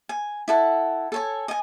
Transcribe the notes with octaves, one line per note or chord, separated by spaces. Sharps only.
G#5
E4 A4 F#5
A4 C#5 G#5
D#5 G#5